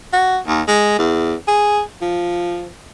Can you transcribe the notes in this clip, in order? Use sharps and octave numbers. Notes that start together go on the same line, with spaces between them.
F#4
D#2
G#3
E2
G#4
F3